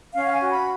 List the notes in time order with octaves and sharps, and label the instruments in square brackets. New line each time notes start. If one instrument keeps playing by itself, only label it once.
[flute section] C#4 F5
F#5
G#5
F#4
B5